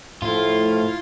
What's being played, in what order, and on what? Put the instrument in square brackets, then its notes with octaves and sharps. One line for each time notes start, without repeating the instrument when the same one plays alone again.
[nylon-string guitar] A2 [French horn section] F3 A3 [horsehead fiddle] E4 F5 [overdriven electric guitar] F4